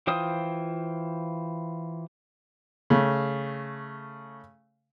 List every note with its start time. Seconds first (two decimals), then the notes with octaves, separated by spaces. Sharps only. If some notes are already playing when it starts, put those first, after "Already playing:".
0.07 E3 F4 C5 G5 D#6
2.90 C#3 A3